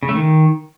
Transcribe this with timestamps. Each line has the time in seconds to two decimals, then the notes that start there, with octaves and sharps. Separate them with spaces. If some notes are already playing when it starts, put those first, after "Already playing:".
0.03 C#3
0.09 A3
0.15 D#3